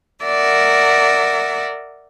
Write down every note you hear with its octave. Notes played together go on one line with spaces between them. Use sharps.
A#4 D5 E5 F#5